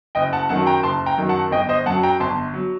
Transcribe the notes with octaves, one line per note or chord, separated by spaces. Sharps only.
F#1 D#5 G5
F#5 A5
F#2 D#3 F#3 F#5 A5
G5 A#5
F#1 A5 C6
G5 A#5
F#2 D#3 F#3
F#5 A5
G1 D#5 G5
C5 D#5
F#2 F#3 F#5 A5
G5 A#5
G1 A5 C6
F#3